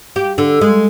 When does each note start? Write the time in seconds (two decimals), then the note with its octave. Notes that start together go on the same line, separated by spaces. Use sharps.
0.16 G4
0.38 D3
0.61 G#3